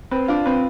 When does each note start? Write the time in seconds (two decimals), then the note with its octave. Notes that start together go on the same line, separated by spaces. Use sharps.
0.11 C4 B4
0.28 D4 F4
0.46 C4 B4